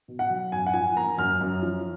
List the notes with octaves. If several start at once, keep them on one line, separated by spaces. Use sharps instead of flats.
B2
F#5
F#3
F#2 G#5
F#5
F3 G#5
A#3 A#5
F#2 F6
F#2
F3